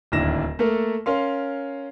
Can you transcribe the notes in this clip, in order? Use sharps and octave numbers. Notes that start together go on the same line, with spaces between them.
D1 D#2 D4 E4 A#6 E7
A3 A#3 A4 A#4
C#4 A#4 F5 C6